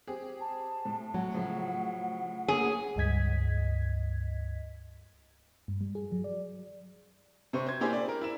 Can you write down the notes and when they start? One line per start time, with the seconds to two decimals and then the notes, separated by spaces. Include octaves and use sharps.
0.07 C4 G4 G#4
0.41 A5
0.85 A2
1.14 A2 F#3 F#5
1.34 A2 C#3 F3
2.48 A#3 B3 G#4 C#5
2.96 C#2 G2 D#5 G#6 B6
5.68 G2
5.81 G3
5.95 G#4
6.12 F#3
6.24 D5
7.53 C3 C5 C#6
7.66 C5 G#6
7.80 A#3 D4 E4 G4 G#4 C5
7.93 D5
8.09 A#4
8.21 E4 E7